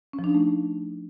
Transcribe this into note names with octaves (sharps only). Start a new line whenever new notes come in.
C#4
F3
D4
D#4
A3